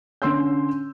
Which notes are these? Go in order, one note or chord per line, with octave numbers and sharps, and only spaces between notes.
D3 C#4 C6 E6 G6